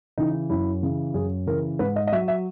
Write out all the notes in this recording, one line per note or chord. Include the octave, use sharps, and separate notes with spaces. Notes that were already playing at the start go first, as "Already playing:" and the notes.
C#3 E3 D#4
F#2 E4
C#3 E3
F#2 G#4
C#3 E3 A#4
G#2 B4
D#5
D#5
F#3 E5
E5